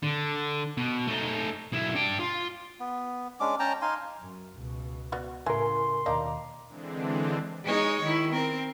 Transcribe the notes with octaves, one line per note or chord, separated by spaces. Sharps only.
D3
B2
A3 D#4
B1 E4
D4 G5
F4
B3
G#3 C#4 D4 D6
C#4 G5 A5 A#5
D#4 F5 G#5 C6
F#2
C#2 B2
B3 F#4 D5
A2 C#3 E3 A#4 G#5 C6
D#2 B2 A#3 D4 D#4 A#5 D6
D3 E3 G#3 C4 D4
G#3 D#4 C#5
D#3 E4
C4 A#4